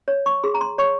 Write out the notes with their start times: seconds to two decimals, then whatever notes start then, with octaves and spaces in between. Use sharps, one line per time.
0.08 C#5
0.26 C#6
0.43 G#4 C6
0.54 A#5
0.61 C6
0.78 C#5 C#6